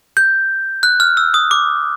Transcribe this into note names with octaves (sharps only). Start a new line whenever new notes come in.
G6
F#6
F6
E6
D#6
D6